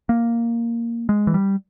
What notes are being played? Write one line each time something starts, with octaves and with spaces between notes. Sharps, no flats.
A#3
G#3
E3
G3